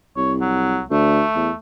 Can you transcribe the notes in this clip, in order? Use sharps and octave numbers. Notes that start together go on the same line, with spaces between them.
C2 C#5
F#3
D2 A3
E2